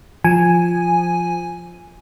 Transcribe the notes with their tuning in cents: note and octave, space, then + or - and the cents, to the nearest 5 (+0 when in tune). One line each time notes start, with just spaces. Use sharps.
F3 +0 G#5 +0